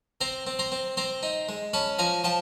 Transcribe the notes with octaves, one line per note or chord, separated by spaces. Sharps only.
C4 A#5 C6
C4
A#5 C6
C4
C4 A#5 C6
D#4
G#3
C#4 A5 B5
F3 G#5 A#5
F3 G5 A5